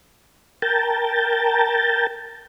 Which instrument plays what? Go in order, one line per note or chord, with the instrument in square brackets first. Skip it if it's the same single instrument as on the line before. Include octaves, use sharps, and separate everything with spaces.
[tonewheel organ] A#4 G5 A5